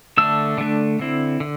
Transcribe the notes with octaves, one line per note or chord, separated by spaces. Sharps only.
D3 A3 D4 E6
D3 A3 D4
D3 C4 E4
D3